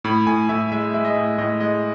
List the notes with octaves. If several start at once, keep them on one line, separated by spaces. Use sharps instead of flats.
A2 B5
A2 G#5
A2 E5
G#3 E5
G#3 E5
D#5
A2
A2 D#5
G#3 D#5